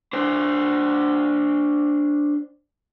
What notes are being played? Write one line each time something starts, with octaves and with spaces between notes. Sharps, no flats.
D4 C5